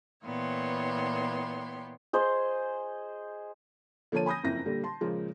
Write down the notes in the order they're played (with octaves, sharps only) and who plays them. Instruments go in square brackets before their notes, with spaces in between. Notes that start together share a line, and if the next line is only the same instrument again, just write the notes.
[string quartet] A#2 E3 B3 C#5 G5 C6
[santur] G#4 C5 D#5
[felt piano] D3 F3 A#3 C#5 A5 D#7
G#5 B5 D#6 G6 A#6
F#1 F2 E4 A#6
A#2 D3 G3
A5 C6
A#2 C#3 F3 G#3 A#3